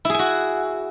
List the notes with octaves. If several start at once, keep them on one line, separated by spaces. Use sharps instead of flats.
E4 F#4 G#4 G#5